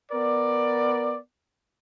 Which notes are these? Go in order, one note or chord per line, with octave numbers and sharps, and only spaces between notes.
B3 A#4 D5